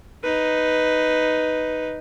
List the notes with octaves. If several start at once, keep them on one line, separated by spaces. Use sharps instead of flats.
D#4 B4